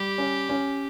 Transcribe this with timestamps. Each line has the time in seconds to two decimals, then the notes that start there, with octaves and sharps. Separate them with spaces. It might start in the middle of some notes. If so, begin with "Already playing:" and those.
Already playing: G3 G4
0.18 C#4
0.49 C#4